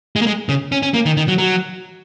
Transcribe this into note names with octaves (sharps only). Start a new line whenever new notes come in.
G#3
A#3
G#3
C#3
C#4
C#4
A#3
D#3
D#3
F#3
F#3